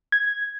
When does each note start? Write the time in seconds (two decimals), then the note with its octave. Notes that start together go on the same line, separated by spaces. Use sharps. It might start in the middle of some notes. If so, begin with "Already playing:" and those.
0.12 G#6